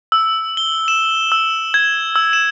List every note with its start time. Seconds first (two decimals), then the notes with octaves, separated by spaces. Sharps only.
0.12 E6
0.57 G7
0.88 E7
1.32 E6
1.74 G#6
2.16 E6
2.33 E7